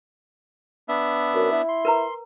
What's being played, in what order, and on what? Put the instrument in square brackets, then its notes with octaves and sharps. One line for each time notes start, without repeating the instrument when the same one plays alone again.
[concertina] B3 D4 E5
[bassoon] F#2
E4
[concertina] C6
[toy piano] A#4 B4 A#5